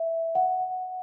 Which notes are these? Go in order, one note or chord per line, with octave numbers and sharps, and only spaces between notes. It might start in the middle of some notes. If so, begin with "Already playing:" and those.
Already playing: E5
F#5